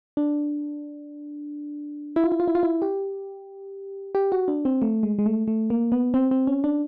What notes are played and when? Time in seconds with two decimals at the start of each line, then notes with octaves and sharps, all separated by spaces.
0.17 D4
2.16 E4
2.24 F4
2.32 E4
2.40 F4
2.48 E4
2.55 F4
2.63 E4
2.82 G4
4.15 G4
4.32 F#4
4.48 D4
4.65 C4
4.82 A3
5.03 G#3
5.19 G#3
5.26 A3
5.48 A3
5.70 A#3
5.92 B3
6.14 C4
6.31 C4
6.47 C#4
6.64 D4